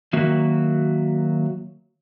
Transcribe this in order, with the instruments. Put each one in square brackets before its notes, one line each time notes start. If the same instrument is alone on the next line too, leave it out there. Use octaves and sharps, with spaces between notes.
[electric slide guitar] D#3 F#3 A#3 F#4 E5